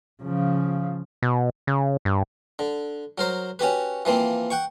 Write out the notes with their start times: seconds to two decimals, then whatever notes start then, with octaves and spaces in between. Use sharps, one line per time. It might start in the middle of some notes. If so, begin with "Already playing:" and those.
0.23 C#3 F3
1.23 B2
1.67 C#3
2.05 G2
2.59 D3
3.18 F#3 A#4 C5
3.59 C#4 F#4 G4 B4
4.05 E3 F3 A#3 C4
4.50 F#5 G5 C#6